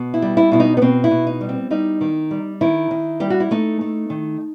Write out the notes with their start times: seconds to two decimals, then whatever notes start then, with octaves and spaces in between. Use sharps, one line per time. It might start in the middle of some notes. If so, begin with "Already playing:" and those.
Already playing: B2
0.14 E4
0.22 G3
0.37 E4
0.51 B2 E4
0.60 D#4
0.77 B3
0.82 B2 C4
1.04 E4
1.11 B2
1.27 D#4
1.41 G3
1.49 C4
1.71 G3 D#4
2.01 D#3
2.31 G3
2.61 D#3 E4
2.91 D#3
3.20 G3 G4
3.30 F#4
3.40 E4
3.51 A3 D#4
3.81 A3
4.10 D#3